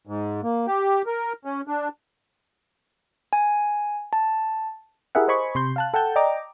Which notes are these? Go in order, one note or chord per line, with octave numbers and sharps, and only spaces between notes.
G#2
A#3
G4
A#4
C#4
D4
G#5
A5
E4 G4 G#4 A#4 E5 F#5
C5 D#5 G#5 B5 C#6
C3 C6 G6
F5 A5 F#6
A4 F#5 G5 A5 G6
D5 D#5 G5 A#5 D6